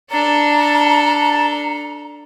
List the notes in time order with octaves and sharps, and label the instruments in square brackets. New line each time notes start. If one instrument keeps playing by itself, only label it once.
[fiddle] D4 A4 [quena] A#5